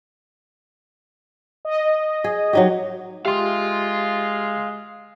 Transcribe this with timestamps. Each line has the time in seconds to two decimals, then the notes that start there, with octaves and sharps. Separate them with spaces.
1.65 D#5
2.24 G#4
2.53 F#3 D#4 G4
3.25 G#3 G4 E5 F5 C6